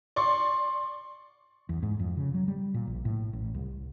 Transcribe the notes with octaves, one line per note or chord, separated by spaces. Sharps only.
D5 C6 C#6
E2
G#2
F2
C#3
F#3
G3
A#2
A#1
A2
A1
C2